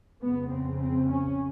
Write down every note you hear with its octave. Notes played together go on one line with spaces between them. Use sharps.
F2 C#3 B3
C4
C4
C#4